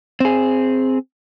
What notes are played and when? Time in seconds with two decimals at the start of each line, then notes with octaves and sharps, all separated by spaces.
0.20 C4 G#4